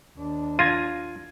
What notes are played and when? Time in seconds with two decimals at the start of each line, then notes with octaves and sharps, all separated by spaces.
0.17 D#2 D4
0.59 F4 G#6 A#6 D#7